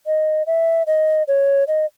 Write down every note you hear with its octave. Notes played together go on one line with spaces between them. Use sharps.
D#5
E5
D#5
C#5
D#5